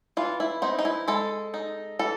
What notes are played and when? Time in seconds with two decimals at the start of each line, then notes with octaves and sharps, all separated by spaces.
0.17 E3 F4
0.40 E4
0.62 C4 D#4
0.79 D#4
0.85 E4
1.08 G#3 A4
1.54 D#4
1.99 E3 A4